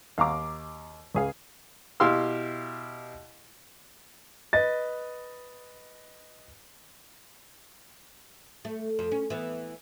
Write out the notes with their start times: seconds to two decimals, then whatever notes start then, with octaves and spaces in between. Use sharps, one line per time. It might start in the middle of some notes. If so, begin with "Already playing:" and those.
0.18 D#2 F5 A#5 D6
1.15 C#2 G#4 F5
2.00 B2 E4 G4 F5 C6 E6
4.53 B4 D#5 A6
8.65 A3
8.99 F2
9.11 C#4
9.30 E3 B3